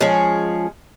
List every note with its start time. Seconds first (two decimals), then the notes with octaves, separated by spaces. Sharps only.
0.01 F3 G#3 C#4 G#4